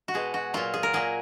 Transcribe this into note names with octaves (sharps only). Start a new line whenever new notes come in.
F#4
B2 G#3 G#4
F#4
A#2 F#3 F4
G#4
A#4
A#2 F#3 G#4